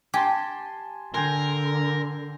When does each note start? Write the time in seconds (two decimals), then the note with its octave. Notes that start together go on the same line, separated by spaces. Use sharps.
0.14 G4 G#5 A5 C6
1.14 D3 A#4 G5 G#5 C6